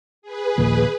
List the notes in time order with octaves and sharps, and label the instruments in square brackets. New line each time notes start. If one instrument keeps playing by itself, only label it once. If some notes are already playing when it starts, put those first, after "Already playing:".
[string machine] G#4 B4
[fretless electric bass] A#1 D#2